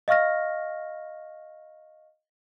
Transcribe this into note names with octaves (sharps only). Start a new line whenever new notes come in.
D#5 F5 C#6 F6 A#6